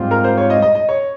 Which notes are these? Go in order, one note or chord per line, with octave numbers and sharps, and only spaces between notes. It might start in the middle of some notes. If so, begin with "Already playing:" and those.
Already playing: G#2 G3 C4 F4
A#4
C5
C#5
D#5
D#5
D#5
C#5